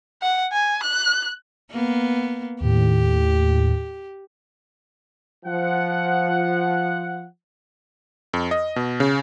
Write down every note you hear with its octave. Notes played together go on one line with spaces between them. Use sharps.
F#5
G#5
F#6
A#3 B3
D#2 A2 G4
F3 F#5
F2
D#5
B2
C#3